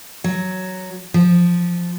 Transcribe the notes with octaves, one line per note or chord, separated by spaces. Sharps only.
F#3
F3